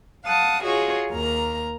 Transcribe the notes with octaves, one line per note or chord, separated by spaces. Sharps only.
F5 F#5 A5 D#6
F4 F#4 G#4 C#5 D#5
D#2 A#3 A#4 A#5